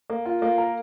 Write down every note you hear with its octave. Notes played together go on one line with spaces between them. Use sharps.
A#3
F4
A#3
A#4